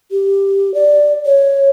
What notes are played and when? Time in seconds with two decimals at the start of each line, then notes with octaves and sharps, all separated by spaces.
0.12 G4
0.74 D5
1.26 C#5